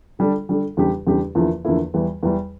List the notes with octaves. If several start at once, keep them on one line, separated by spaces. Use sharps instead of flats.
D3 G3 D4 A4
D3 G3 D4 A4
E2 C#3 G3 D4 G4
E2 C#3 G3 D4 G4
E2 D3 F3 A#3 E4
E2 D3 F3 A#3 E4
E2 E3 G3
E2 E3 G3